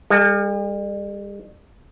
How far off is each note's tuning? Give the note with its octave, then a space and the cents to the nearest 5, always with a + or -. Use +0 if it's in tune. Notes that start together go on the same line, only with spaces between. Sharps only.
G3 +45 A4 +0